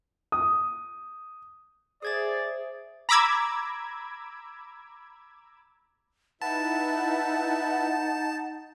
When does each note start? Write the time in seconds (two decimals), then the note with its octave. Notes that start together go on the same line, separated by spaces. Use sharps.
0.32 D#6
2.02 G#4 C5 D5 E5 D#6 G#6 A6
3.09 A#5 B5 D6 E6 G#6
6.42 D#4 E4 B4 E5 F#5 A5